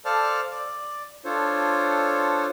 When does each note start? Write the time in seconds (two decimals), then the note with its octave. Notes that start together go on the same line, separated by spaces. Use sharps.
0.05 A4 C5 D5 F5 A5 F6
0.51 D5
1.25 D4 F4 A4 C5 C#5